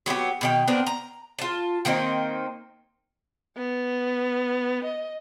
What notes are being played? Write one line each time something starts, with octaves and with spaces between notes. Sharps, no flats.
F#3 B3 D#4 G4
B2 D#3 G5
B3 C4 D4 A#4
A#5
F4 A5
D#3 A#3 C4 D#4
B3
D#5